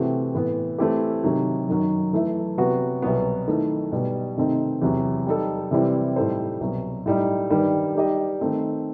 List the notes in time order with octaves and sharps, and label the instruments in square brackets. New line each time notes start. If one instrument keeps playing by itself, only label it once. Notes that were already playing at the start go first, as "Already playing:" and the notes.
Already playing: [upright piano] C3 E3 A3 C4 F#4
A2 E3 B3
E3 A3 C4 E4 G4
C3 D#3 F#3
F#2 D#3 F#3
E3 A3 E4 A4 E5
C3 F#3 B3 F#4 B4
C2 B2 F#3 B3
D#3 A3 E4
B2 G3 D#4
C3 D#3 A3 C4 D#4
E2 C3 F#3
G3 D#4 A4
C3 E3 G3 C4 E4
A2 G3 D#4 A4 C5
C2 B2 F#3
A2 G3 D#4
G2 D#3 G3
G3 D#4 G4 D#5
D#3 A3 C4 D#4